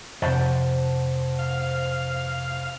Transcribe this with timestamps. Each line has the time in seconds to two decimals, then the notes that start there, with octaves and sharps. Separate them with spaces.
0.22 F2 C3 C5 F#5 A5
1.39 F5